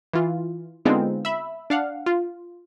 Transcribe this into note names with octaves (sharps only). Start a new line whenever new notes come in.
E3 F4
D3 G#3 B3 C4 D#4 F4
E5 B5
D4 F5 F#5
F4